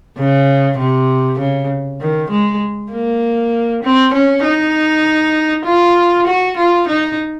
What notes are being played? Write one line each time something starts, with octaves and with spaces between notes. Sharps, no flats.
C#3
C3
C#3
D#3
G#3
A#3
C4
C#4
D#4
F4
F#4
F4
D#4